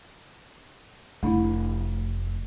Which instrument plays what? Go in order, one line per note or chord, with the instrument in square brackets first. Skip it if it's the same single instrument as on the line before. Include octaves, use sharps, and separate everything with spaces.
[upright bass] F1 F4 [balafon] A3 D4 E4